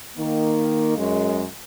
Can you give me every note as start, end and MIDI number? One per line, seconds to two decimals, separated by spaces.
0.17 0.95 51
0.17 0.95 58
0.96 1.43 42
0.96 1.43 56